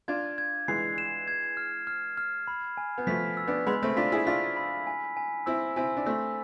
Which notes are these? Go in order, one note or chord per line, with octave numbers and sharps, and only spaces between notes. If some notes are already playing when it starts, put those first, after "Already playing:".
D4 F4 G#6
G#6
E3 G#3 C7
E7
G#6
F6
F6
F6
B5
G#5
B3
F3 A3 B6
E6
B3 D4
G#3 B3 B5
A3 C4
D4 F4 B6
E4 G#4
D4 F4 B6
B5
G#5
G#5
C4 E4 E6
C4 E4 G#5
D4
A3 C4 E6